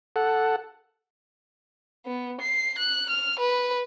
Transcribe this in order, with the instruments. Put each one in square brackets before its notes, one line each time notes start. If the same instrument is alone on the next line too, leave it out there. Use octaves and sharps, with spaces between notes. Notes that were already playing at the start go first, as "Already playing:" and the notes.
[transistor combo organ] A4 F#5
[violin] B3
C7
F#6
F6
B4